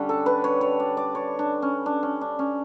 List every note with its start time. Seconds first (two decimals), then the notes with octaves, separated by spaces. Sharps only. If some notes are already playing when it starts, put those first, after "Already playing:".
Already playing: D3 G3 C#4
0.09 A4
0.26 B4
0.44 C#5
0.61 C#5
0.80 D5
0.97 D5
1.15 C#5
1.39 D4
1.62 C#4
1.86 D4
2.03 C#4
2.21 D4
2.39 C#4